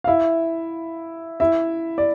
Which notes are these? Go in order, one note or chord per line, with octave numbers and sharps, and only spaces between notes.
F5
E4 E5
E4 E5
D5